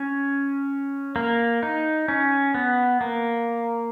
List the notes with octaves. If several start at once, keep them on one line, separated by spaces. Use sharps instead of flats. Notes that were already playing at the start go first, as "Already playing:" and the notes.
Already playing: C#4
A#3
D#4
C#4
B3
A#3